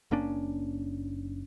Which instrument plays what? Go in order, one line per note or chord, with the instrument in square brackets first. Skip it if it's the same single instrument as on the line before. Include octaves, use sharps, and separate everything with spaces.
[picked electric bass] F#1 A#3 C#4 D4